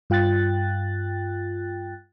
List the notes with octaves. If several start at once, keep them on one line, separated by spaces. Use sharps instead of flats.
G2 F4 G5 F#6 A6